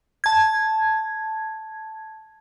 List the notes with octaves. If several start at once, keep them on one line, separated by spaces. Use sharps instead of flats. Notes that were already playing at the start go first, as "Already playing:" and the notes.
A5 G#6